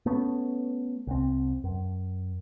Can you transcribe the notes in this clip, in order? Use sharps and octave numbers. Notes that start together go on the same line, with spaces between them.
A3 B3 C#4
C2 C4
F#2